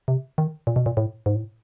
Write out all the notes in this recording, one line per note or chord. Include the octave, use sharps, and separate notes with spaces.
C3
D#3
A#2
B2
A#2
A2
G#2
A2